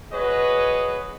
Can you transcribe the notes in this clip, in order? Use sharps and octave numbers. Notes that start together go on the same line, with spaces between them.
F#4 G#4 B4 C#5 D#5